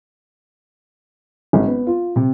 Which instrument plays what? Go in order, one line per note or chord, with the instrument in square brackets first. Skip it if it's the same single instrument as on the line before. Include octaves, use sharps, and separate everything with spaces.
[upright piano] G#1
B3
F4
C3